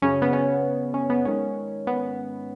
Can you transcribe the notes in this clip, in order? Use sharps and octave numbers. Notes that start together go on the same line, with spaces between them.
F#2 C#3 C#4
B3
C#4
C#4
B3
G#2 D#3 C#4
B3